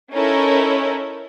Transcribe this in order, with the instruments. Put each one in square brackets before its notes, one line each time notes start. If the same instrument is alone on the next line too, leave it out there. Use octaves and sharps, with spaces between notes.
[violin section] C#4 D#4 E4 A4 A#4 C#5